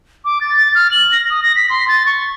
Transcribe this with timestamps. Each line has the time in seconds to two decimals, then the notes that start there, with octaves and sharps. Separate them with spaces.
0.25 D6
0.41 A6
0.57 A6
0.75 F6
0.92 F#7
1.12 A#6
1.30 D#6
1.42 A#6
1.56 B6
1.70 C6
1.88 A6
2.06 C#6